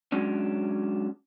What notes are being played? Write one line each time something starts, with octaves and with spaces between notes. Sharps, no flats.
F#3 G#3 C#4 D4